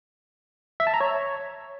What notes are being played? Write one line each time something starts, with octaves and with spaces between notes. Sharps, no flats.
E5
A5
A#5
C#5